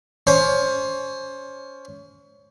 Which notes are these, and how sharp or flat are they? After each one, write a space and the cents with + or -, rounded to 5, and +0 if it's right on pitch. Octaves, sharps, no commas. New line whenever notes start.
C#4 +25 C5 +20